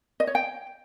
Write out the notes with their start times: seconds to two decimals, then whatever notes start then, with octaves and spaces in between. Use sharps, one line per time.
0.20 D#5
0.27 C#5
0.35 G5